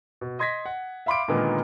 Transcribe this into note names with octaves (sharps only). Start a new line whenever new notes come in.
B2
D#5 C6 G#6 A#6 B6
F#5
E5 F5 B5 C6 D6 D7
A#2 D3 D#3 G#3 A#3 B3